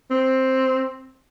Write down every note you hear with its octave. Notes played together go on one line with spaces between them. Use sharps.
C4